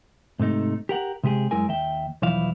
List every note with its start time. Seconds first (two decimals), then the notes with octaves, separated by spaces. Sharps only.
0.39 G#2 C3 A3 D#4
0.89 G4 A#4 F#5
1.24 C3 G#3 G4 G#4
1.51 F#2 G#3 E4 A#4 G#5
1.68 D#2 E5 G5
2.22 B1 E2 E3 F3 E4 F5